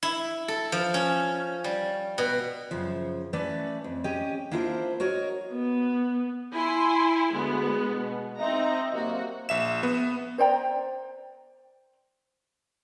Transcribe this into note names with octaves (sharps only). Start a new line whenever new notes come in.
E4
A4
F3
C#4
G3
B2
F#2 C#3 F3
E3 A3 C#4 B4 D5
F2
C#4 G4 D#5
A#3 D4 E4 F4 A#4 C5
F#4 A#4 C#5 D#5
B3
E4 G#5 C6
D2 G#3 B3
B2
C4 D#4 D#5 E5 A#5
C3 F#3 A#3 F#4
A#1 E5 E7
B3
C5 D5 G5 A#5